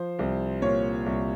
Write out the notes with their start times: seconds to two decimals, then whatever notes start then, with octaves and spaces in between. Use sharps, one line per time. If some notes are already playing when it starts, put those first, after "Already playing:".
Already playing: F3 C5
0.19 C2
0.62 A#2 C#5
1.06 C2